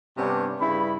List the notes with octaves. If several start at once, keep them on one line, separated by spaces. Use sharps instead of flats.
G2 C3 B3 C#4 D4
G2 C#3 E4 B5